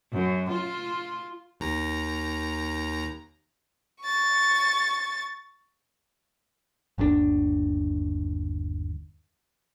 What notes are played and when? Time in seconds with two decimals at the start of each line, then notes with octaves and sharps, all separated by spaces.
0.12 F#2
0.50 F4
1.60 D#2 A#5
4.02 C#6 A6
6.98 G1 D#2 A#2 D4